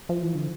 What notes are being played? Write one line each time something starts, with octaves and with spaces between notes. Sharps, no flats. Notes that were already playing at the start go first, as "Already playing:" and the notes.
F3
E3
D3